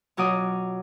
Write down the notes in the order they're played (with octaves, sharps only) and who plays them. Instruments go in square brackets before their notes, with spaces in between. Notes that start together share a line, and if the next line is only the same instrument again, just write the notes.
[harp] B2 F#3 F4 D6 D#6